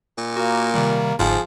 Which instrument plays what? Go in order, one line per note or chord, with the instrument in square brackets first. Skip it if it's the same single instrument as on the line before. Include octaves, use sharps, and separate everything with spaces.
[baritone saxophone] A#2
[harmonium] A#3 A#4 [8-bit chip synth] F#4
[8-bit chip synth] C3 D#3 G3
[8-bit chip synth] G1 G#2 [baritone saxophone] F3 [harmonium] G#4